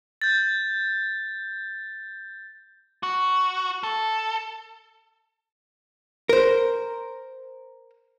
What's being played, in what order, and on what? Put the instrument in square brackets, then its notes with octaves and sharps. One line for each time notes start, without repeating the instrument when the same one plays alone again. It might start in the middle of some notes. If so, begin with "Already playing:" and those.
[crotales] G6 A6
[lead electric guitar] F#4
A4
[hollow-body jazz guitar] A#4 C5